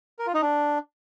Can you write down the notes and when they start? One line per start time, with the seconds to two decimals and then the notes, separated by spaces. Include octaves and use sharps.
0.19 A#4
0.27 F4
0.34 D#4
0.42 D4